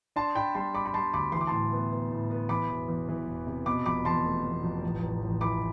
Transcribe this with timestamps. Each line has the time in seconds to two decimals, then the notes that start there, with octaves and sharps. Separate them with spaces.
0.16 D4 A5 C6
0.35 D4 G5 B5
0.55 G3 A5 C6
0.74 G3 B5 D6
0.86 B5
0.94 G3 A5 C6
1.14 D2 B5 D6
1.32 E3 C6
1.41 D6
1.47 A2 A5 C6
1.72 B3
1.92 B3
2.11 A2
2.30 B3
2.49 E3 B5 D6
2.69 E1
2.89 E2
3.09 E3
3.27 E1
3.47 C3
3.66 B2 B5 D6
3.86 F1 B5 D6
4.05 E2 A5 C6
4.25 A3
4.45 E2
4.63 F1
4.83 A1
5.02 A1
5.23 A1
5.41 E3 B5 D6